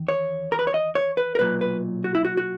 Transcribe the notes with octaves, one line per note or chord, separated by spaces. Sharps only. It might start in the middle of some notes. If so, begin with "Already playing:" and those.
Already playing: E2 D#3
C#5
A#4
B4
C#5
D#5
C#5
B4
A#4
B1 A#2 F#3 B4
B4
F#4
E4
F#4
F#4